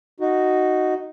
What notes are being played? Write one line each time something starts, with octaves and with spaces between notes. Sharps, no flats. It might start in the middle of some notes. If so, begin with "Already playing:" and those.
D#4 F#4